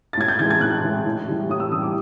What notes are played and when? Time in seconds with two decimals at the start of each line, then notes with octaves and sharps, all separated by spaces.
0.13 A6
0.17 A2 G#6
0.28 G6
0.39 E3 G#3 G#6
0.51 G#6
0.61 A2 F#6
0.83 E3 G#3
1.06 A2
1.27 E3 G3
1.49 A2 D#6
1.60 E6
1.71 E3 D#6
1.75 G3
1.82 D6